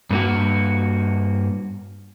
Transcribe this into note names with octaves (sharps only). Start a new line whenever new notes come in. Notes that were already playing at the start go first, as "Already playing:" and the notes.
G2 A#3 F#4